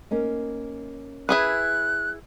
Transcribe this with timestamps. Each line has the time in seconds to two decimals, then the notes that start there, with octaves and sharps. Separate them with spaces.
0.11 A#3 C#4 D#4
1.29 E4 G#4 B4 F#6